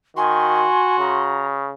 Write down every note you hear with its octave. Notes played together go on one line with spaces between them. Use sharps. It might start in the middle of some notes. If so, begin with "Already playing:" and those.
D#3 F#4 G#5 C6
C#3 A#5